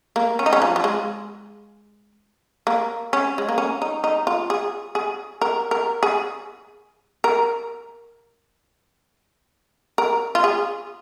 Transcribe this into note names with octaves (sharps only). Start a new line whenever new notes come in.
A#3
C#4
D#4
C#4
F3
F3
G#3
A#3
C#4
G#3
A#3
C#4
D#4
D#4
F4
G#4
G#4
A#4
A#4
G#4
A#4
A#4
F4
G#4